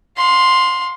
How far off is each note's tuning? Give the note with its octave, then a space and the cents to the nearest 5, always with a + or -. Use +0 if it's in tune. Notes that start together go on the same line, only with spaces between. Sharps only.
F5 +30 C6 +0